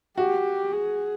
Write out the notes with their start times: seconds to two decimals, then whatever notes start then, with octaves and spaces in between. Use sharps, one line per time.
0.17 F#4 G4
0.73 G#4